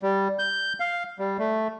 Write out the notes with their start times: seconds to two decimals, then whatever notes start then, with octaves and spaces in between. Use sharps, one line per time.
0.02 G3
0.39 G6
0.80 F5
1.19 G3
1.39 A3